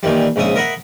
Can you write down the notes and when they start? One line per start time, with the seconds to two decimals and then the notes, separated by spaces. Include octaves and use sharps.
0.03 A#2 D#3 E3 G3
0.36 A#1 G#2 C#3 E5 D#6
0.56 A#4 D#5 E5 F#5 B5